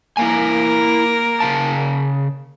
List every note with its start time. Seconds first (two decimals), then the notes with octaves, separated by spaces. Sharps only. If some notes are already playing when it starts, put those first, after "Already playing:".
0.17 A#3 E4 A#4 F5 G#5
1.40 C#3 F5 A5